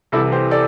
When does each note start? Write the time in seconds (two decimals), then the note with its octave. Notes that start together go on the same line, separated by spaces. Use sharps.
0.12 C2 C3 E3 E4 A4
0.32 G4 C5
0.51 A4 D5